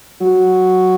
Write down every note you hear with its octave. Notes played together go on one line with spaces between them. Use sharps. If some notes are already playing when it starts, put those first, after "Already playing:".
F#3